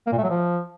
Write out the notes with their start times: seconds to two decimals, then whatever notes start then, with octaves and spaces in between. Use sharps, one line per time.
0.07 A#3
0.13 A#2
0.18 A3
0.24 F#3
0.29 F3